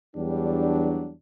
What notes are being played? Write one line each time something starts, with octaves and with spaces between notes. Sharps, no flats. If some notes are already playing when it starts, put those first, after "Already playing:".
E2 F#3 G3 D4